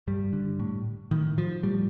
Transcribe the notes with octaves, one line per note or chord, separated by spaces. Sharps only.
G2 G3
D3
A2
A2 D#3
F3
A2 G3